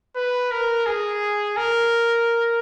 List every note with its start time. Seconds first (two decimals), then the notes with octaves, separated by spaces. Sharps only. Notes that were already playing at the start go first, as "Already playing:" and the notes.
0.16 B4
0.51 A#4
0.86 G#4
1.57 A#4